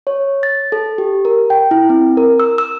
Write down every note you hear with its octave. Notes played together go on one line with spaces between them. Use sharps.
C#5
A6
A4
G4
A#4
G5
E4
C4
A#4
E6
E6